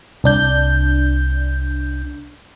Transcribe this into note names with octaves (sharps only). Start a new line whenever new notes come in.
C2 D4 G6